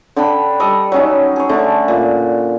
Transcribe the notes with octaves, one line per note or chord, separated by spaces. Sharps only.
D3 D4 G5 B5
G3 A4 D5 D#5
F#3 C#4 D#4
G#4 C#5
D3 A3 C#4
A#2